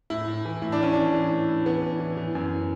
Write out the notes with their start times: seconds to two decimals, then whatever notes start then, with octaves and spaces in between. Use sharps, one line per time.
0.10 A2 E4
0.28 A2
0.45 E3
0.62 A2 E4
0.72 D4
0.79 E3 C#4
0.93 E3 D4
1.13 E3
1.30 A2
1.48 A2
1.65 E3 B3
1.82 E3
2.00 E3
2.17 E3
2.35 F#2